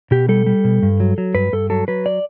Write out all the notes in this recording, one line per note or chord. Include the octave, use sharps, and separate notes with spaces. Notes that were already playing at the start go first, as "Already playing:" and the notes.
B2 G4
G3 A4
G3
B2
G2
F#3
F#3
G2 B4
G2 A4
F#3 A4
F#3 B4
D5